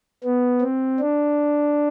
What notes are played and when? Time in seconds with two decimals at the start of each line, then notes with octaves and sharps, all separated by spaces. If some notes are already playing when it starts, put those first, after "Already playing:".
0.24 B3
0.62 C4
1.00 D4